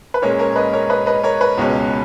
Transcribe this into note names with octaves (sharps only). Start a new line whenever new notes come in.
B4
A#2 G#3 C#4 A#4 C#5
A#4 C#5
B4 D#5
A#4 C#5
B4 D#5
B4 D#5
A#4 C#5
B4
C#2 B2 G#3 C#4